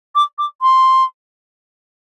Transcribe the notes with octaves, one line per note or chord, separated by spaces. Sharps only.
D6
D6
C6